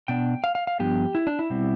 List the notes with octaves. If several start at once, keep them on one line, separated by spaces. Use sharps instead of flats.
B2 B3 D4 G5
F5
F5
F5
G2 F3 B3 D4 G4
E4
D4
E4
B2 G3 C4